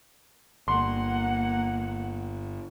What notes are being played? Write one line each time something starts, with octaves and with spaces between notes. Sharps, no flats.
G1 A#3 F#5 C6